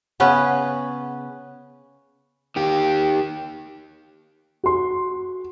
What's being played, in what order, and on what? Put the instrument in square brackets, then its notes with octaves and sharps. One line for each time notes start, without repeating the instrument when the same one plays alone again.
[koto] C#3 B3 C#4
[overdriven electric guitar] D#3 G4
[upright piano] F#4 C6